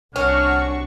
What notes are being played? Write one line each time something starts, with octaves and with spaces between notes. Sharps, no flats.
C2 C#4 D4 F#4 C#6 F6